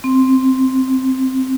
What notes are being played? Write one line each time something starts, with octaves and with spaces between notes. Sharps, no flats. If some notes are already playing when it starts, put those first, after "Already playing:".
C4